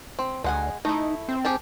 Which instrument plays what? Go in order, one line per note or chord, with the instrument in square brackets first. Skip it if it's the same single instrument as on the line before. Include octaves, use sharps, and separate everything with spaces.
[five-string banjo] C4
[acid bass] D2 [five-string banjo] G#3 F#5 G#5
[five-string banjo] A3 E4 [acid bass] D#4
[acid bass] C4
[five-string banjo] G4 G#4 A5